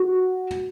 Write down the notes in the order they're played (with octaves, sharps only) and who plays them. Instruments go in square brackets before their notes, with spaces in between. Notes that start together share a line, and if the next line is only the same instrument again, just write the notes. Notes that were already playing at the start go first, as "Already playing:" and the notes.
Already playing: [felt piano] F#4